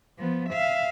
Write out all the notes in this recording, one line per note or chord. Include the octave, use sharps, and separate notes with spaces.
F3 B3
E5 F5